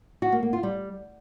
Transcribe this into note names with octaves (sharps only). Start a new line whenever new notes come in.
F#4
A#3
A#3
F4
G3